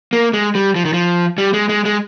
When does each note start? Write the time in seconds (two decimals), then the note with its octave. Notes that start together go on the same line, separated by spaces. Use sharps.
0.13 A#3
0.33 G#3
0.55 G3
0.75 F3
0.85 D#3
0.93 F3
1.38 G3
1.53 G#3
1.69 G#3
1.85 G#3